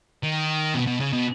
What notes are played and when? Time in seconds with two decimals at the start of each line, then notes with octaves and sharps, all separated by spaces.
0.23 D#3
0.75 B2
0.87 B2
1.00 C#3
1.13 B2